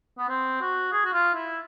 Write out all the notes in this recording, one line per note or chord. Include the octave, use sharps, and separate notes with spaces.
B3
C4
F#4
G#4
F#4
F4
E4